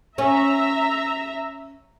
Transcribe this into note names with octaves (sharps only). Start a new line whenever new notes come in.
C#4 E5 A#5